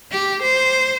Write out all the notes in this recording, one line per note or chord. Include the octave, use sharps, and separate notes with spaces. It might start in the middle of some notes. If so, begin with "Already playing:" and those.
G4
C5